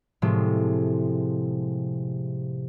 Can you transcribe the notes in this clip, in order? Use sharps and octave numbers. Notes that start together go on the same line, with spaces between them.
A2 C3 F3 G#3